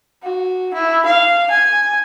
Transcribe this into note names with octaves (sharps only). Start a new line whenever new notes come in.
F#4
E4
F5
G#5